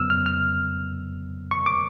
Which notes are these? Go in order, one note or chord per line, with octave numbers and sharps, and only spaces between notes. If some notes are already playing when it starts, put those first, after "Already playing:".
Already playing: F2 C#3 F#3 B3 E6 F6
F6
F6
C#6
D6